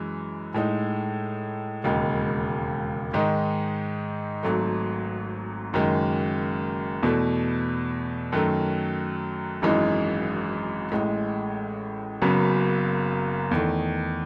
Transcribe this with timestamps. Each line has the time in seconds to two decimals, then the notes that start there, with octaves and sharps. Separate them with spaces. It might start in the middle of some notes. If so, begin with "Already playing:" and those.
Already playing: F#2 E3 G#3
0.54 A2 G#3 D#4
1.84 E1 D#2 C#3 G#3
3.13 G#2 D#3 G#3 D#4
4.43 G#1 G#2 F#3 A3
5.73 F#1 F#2 D#3 G#3
7.03 E2 B2 A3
8.32 F#2 D#3 F#3 A3
9.62 G#1 F#2 E3 G#3 D#4
10.92 A1 A2 G#3
12.22 F#1 F#2 C#3 F#3 B3
13.51 E2 D#3 A3